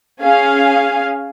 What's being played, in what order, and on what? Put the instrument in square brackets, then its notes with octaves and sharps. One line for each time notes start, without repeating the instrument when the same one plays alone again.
[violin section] C#4 G#4 F5 G#5